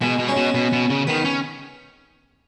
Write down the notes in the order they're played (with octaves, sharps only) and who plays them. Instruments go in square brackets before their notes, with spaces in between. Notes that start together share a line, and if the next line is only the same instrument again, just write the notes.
[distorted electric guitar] B2 [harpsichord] G#3
[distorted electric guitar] B2
[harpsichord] G#3 C#4
[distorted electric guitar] B2
B2
B2
C#3
[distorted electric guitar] D#3 [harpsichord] B3
[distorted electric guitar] C#4